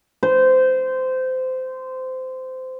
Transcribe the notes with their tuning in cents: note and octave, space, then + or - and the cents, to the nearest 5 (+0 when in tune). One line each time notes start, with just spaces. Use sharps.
C5 -20